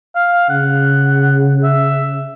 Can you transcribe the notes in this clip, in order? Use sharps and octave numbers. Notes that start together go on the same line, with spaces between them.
F5
C#3 F#5
E5